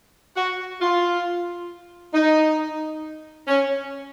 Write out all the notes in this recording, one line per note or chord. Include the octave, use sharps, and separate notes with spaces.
F#4
F4
D#4
C#4